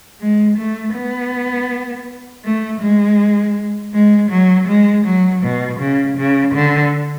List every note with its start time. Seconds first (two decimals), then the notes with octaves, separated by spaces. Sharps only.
0.19 G#3
0.57 A3
0.94 B3
2.43 A3
2.80 G#3
3.93 G#3
4.30 F#3
4.68 G#3
5.05 F#3
5.42 B2
5.79 C#3
6.17 C#3
6.54 D3